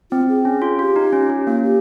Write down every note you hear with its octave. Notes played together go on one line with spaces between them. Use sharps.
C4 F4
G#4
C#4
F4
F4 G4
D#4
C#4
C#4
A#3 F4
G4